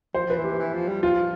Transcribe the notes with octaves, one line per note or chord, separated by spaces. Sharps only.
F3 C5
F3 B4
E3
G4
E3
F3
G3
F3 F4